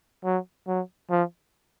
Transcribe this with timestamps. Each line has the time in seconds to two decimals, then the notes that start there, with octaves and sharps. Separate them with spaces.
0.25 F#3
0.68 F#3
1.10 F3